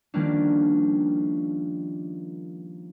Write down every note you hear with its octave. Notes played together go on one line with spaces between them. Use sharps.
D#3 F3 G3 A#3 C#4 D4